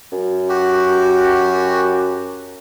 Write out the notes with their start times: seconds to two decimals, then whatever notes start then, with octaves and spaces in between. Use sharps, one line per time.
0.12 F#2
0.49 F#4 G4